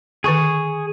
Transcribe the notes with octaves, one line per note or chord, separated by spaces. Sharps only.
D3 D#3 G#4 C#6